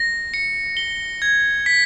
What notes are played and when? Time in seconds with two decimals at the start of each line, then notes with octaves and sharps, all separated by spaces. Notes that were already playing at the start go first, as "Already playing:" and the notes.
Already playing: A#6
0.34 C#7
0.77 G7
1.22 G#6
1.66 B6